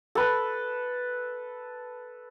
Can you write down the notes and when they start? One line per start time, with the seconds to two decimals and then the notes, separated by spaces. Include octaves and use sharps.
0.15 A4 B4